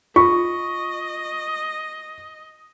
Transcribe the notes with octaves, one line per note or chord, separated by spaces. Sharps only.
F4 D#5 C#6